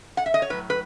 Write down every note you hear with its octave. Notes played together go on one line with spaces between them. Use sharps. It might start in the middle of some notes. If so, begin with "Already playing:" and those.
F#5
E5
D#5
C#5
A2 F#3 B4
B4